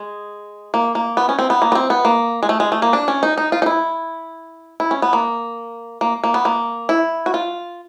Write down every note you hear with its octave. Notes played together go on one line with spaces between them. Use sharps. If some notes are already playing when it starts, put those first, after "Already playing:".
Already playing: G#3
A#3
A#3
B3
C#4
C4
B3
A#3
B3
C4
B3
A#3
G#3
A3
G#3
A3
A#3
D4
C#4
D#4
D#4
F4
D#4
E4
E4
C#4
B3
A#3
A#3
A#3
B3
A#3
E4
F#4
F4